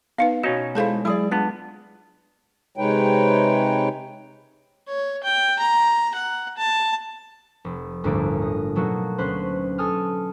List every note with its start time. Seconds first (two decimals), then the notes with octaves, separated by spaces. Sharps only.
0.18 B3 D#4 B4 F5
0.44 B2 C#4 D#4 F#4
0.75 G#3 E4 G#4 A4 C5 F5 A5
1.05 F#3 E4 G#4 D5
1.31 B3 D4 F4
2.77 C3 G#3 D#4 B4 C#5 G5
4.88 C#5
5.24 G5
5.59 A#5
6.14 F#5
6.57 A5
7.65 F1
8.04 G1 D2 A2 D3 A#3 D7
8.42 D#5
8.75 B2 F#3 A3 A#3 D#4 F#4
9.18 D2 C#4 B4 C5 F#6
9.78 A4 G#5 D#6 F6